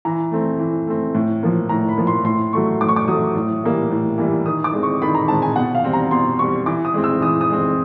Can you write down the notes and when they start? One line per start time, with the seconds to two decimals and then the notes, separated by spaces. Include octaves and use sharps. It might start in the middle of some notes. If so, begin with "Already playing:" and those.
0.05 E3 A#5
0.31 A3 C4
0.59 E3
0.87 A3 C4
1.15 A2
1.43 F3 A#3
1.69 A2 A#5
1.89 B5
1.97 F3 A#3
2.07 C6
2.25 A2 C6
2.53 F#3 A3 C#6
2.81 A2 D6
2.88 C#6
2.96 D6
3.08 F#3 A3 D#6
3.35 A2
3.64 E3 G3 A#3
3.91 A2
4.18 E3 G3 A#3
4.46 D#3 D#6
4.64 D6
4.73 G#3 C4
4.83 C#6
5.02 D#3 B5
5.15 A#5
5.28 G#3 C4 A5
5.42 G#5
5.56 B2 F#5
5.75 F5
5.84 G3 C4
5.93 A#5
6.11 B2 C6
6.39 G3 C4 C#6
6.66 E3 D6
6.85 D#6
6.94 G#3 C4
7.04 E6
7.21 E3 D#6
7.41 D#6
7.50 G#3 C4